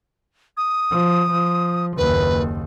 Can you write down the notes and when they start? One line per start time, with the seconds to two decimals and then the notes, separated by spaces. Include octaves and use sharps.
0.57 D#6
0.91 F3
1.31 F3
1.98 F#1 D#2 B4